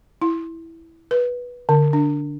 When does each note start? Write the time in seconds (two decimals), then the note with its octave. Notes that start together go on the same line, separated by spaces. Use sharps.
0.22 E4
1.11 B4
1.69 D3
1.93 D4